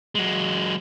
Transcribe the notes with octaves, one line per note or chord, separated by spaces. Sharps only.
F#3 G#3